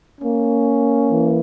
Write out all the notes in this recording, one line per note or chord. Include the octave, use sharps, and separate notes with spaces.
A#3 C#4
E3